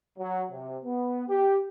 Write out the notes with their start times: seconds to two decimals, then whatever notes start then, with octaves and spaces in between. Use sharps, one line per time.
0.18 F#3
0.51 C3
0.84 B3
1.29 G4